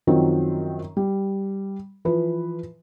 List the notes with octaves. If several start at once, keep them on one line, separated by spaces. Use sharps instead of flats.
F#2 D#3 F3 F#3 C4
G3
E3 F3 B4